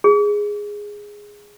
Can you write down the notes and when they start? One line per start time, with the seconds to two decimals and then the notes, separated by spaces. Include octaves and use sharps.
0.04 G#4